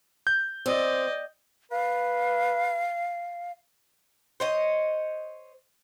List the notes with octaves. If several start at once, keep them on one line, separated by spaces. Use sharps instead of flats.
G6
C4 D5 D#5
B4 F5
C5 C#5 D#5